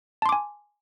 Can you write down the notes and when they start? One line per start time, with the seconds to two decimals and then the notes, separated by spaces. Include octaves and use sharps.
0.22 A5
0.26 C6
0.29 D6
0.32 G#5